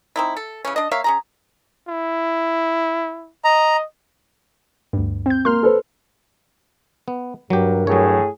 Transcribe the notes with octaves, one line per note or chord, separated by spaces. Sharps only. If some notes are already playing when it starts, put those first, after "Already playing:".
C4 D#4 E4
A4
C#3 E3 C#4
D4 D#5
A#3 C#5 E5 F5
C#4 G#4 A#5
E4
D#5 A#5
D2 G2
C4 G6
A#3 C6 F6
A4 B4 C5
B3
G2 F#3 G3 G4 A#4
A2 F#3 G#4 C#5